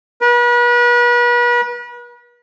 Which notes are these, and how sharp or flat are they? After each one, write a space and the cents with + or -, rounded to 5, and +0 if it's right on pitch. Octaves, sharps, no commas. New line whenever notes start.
B4 -40